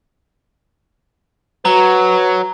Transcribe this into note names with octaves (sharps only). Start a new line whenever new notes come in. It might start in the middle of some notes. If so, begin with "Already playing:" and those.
F#3 F#4 B4 A#5